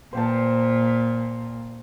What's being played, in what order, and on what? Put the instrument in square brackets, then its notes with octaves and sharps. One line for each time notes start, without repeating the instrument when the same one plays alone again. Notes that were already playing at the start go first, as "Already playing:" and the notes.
[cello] A#2 [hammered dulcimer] C5 G5 A5